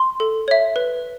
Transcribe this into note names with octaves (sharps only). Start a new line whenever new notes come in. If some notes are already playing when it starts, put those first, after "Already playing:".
Already playing: C6
A4
C#5 E5
B4